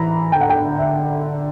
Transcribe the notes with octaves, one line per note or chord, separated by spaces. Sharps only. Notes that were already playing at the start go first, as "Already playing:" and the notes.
Already playing: E3 A#5 B5
D3 G5
F#5
G5
E5